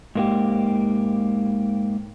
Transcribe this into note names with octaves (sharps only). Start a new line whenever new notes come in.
G#2 A#3 G4